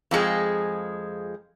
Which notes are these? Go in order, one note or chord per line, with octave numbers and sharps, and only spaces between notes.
F2 F3 G#3 G#4